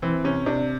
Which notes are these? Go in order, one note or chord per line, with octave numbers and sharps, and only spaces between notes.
E3 C4
C3 C#4
C3 D4